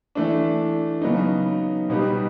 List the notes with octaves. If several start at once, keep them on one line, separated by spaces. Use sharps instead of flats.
E3 A3 D4
C#3 F#3 B3 D#4
B2 G3 B3 D#4 G4